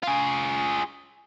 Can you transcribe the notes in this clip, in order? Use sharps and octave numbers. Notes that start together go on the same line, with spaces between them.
F4 G#4